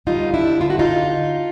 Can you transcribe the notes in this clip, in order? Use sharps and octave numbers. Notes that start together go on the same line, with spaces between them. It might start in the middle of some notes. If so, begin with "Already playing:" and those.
D#2 D3 G3 D#4 F4
D4 E4
D#2 D3 G3 F4
F#4
D#4 F4